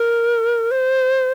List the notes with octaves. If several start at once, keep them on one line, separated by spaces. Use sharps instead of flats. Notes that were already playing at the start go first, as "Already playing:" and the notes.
Already playing: A#4
C5